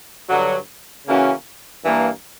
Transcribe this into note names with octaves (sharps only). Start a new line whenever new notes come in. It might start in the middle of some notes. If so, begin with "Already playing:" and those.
G2 D3 F#3
C#3 E3 A#3 C#4 F#4
G2 E3 A#3